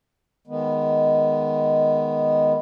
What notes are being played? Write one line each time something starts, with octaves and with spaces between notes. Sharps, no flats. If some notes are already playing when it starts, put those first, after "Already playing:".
D#3 G#3 B3